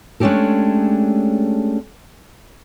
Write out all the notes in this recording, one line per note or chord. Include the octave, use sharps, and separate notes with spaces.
G#3 A3 C#4 D4 G4 A4